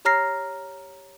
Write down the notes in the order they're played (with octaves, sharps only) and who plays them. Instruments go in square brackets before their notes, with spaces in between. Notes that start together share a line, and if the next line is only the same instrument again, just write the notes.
[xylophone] G4 C#5 A#5 F6 A#6 C7